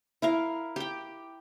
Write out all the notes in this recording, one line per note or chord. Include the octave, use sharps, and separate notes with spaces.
E4 A#4 F5
G4 G5